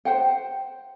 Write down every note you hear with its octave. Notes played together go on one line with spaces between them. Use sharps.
C5 F#5 G5